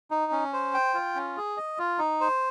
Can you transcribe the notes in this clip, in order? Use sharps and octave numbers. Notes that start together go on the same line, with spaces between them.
D#4
C#4
C5
G5
F4
C#4
G#4
D#5
F4
D#4
C5